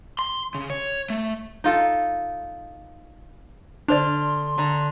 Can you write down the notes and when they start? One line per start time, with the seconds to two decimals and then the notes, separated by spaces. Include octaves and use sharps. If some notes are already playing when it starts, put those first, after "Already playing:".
0.19 C6
0.55 C#3
0.70 C#5
1.10 A3
1.64 D#4 F4 A4
3.88 D3 D4 C5 D5 C6 F6
4.58 D3 A#5